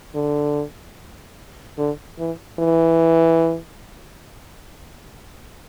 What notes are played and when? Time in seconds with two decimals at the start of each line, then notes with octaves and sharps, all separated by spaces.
0.15 D3
1.78 D3
2.18 E3
2.59 E3